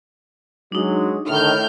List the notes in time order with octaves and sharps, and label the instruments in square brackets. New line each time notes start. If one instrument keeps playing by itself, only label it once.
[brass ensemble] F#3 G#3 [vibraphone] D4 D#4
[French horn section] A2 [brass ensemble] D3 D#3 [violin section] F6 G6